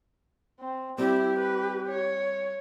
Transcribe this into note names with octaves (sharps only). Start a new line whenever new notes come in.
C4
G3 C4 E4 G4
B4
C#5